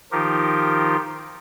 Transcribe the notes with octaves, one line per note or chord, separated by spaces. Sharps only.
D#3 F3 D#4 F4 G4 A#4